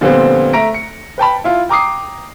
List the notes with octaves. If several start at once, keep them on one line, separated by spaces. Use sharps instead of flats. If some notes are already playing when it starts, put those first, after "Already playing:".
A#2 D3 F3 G3 B3 C4
A3 E5 A#5 A#6 D7
C#7
B4 G5 A5 B5
E4 F4
G5 A#5 D6 D#6 C7